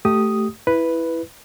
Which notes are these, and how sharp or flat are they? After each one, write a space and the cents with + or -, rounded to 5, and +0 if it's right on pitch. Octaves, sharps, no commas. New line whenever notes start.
A3 +0 G4 -15 D#6 +0
E4 +0 B4 +0